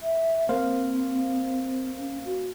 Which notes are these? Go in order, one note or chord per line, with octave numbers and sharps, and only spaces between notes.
E5
A#3 C4 C5 F5
C#4
F#4